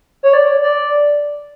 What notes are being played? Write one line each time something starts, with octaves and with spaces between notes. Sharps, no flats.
C#5
D5
D5